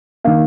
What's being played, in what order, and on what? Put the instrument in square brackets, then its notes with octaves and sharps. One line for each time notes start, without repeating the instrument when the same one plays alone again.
[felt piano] D#3 A#3 F5